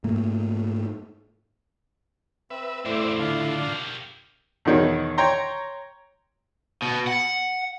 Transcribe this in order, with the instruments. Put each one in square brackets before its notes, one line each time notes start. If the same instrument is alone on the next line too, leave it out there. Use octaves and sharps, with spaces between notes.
[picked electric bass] G#2 A3 A#3
[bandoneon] C4 [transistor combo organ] B4 E5
[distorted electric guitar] A2 C#3 [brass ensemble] A3 E4 [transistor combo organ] C5 D5 E5
[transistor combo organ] D3 [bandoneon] D4 F4 F5
[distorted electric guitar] G3 A#4
[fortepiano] E2 B2 D#3 C#5
C#5 G5 A#5 C6
[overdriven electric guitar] B2
F#5